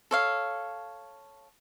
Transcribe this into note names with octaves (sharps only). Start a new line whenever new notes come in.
A4 C#5 F5